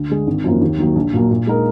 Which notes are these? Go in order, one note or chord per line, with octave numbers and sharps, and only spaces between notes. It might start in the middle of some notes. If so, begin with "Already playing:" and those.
Already playing: D2
D3 G#3
G#1
F#2 F3 A#3
D#2
D#3 F#3 A#3
A#1
A#2 F#3 A#3
A#2
G#3 D#4 A#4